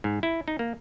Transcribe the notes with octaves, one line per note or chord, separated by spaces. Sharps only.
G#2
E4
D#4
A#3